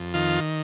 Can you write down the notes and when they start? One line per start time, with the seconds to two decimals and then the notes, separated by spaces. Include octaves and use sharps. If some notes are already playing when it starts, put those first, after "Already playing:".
Already playing: F2
0.14 D#3 F4